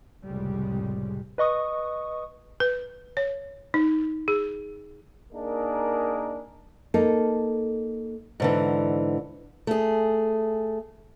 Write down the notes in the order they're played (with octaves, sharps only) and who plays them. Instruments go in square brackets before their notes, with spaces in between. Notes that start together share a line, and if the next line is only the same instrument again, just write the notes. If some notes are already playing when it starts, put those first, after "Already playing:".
[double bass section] C2 F2 A2 C#3 G3 G#3
[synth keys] B4 D#5 C#6 D#6
[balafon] B4
C#5
D#4
G#4
[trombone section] A#3 D4 D#4 G#4 A#4
[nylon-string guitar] A#3 D#4 A4
[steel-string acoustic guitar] G#2 D3 E3
A3 G#4